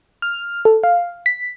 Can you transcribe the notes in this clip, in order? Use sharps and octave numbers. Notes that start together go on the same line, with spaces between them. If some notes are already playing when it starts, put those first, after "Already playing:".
F6
A4
F5
B6